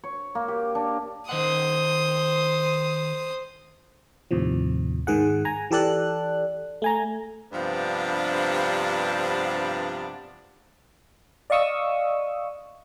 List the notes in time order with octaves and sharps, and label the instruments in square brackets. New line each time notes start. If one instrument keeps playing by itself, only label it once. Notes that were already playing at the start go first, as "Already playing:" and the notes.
[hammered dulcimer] C#5
A#3
G4
D4
[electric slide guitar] D#3 D#5 F#5 [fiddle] C5 D#6
[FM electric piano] D#2 A2 C3 F3
G#2 D#3 G#4 F#5
G#5 A#5
E3 G4 A4 D5 F#6
A3 G#5 A#5
[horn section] G2 C3 F3 B3 D4 B4
[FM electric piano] D5 D#5 F5 C#6 D#6 E6